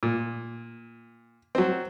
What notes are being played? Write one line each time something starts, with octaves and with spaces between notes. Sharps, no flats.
A#2
F#3 C4